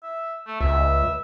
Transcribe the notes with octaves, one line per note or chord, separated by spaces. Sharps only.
E5
A3
C#2 E5